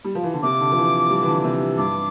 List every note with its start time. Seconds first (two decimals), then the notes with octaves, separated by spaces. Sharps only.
0.04 G3
0.15 F3
0.23 E3
0.34 D3
0.43 C3 D6
0.60 D3
0.72 F3
0.77 E3
1.10 G3
1.22 E3
1.27 D3
1.44 C3
1.77 G2 D6